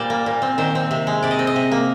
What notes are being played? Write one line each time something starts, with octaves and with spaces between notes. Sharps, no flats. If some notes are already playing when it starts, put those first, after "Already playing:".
Already playing: A#2 G3 C5 D5
A#3
A#2
C4
D#3 C5
C4
C3
G#3
C3 D5
D#5
C4
D#5
C3
A#3